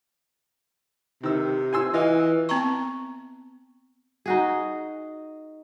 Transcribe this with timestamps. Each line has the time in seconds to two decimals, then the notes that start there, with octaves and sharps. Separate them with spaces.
1.23 C3 D#3 E6
1.73 G#5 C6 E6
1.94 E3 F4 D#5
2.49 B3 C4 A5 A#5 C#6
4.26 D#4 F#4 G#4